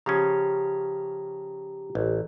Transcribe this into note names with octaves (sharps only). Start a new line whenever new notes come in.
C#3 F3 C#4 G4 A#5
A1